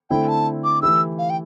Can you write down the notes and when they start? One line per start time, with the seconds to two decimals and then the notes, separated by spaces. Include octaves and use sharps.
0.10 D3 A3 C4 E4 G5
0.28 A5
0.64 D6
0.82 E3 A3 E4 G4 E6
1.18 F5
1.30 G5